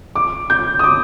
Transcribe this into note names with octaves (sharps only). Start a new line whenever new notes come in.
D6
G6
D#6
D6